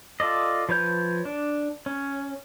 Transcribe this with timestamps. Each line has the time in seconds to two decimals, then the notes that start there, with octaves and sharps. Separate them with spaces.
0.20 F4 A4 D5 D#5
0.69 F3 B4 C#5 G6
1.25 D4
1.86 C#4